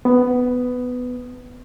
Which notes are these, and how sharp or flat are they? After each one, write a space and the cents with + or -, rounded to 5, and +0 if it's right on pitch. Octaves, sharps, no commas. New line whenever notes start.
B3 +10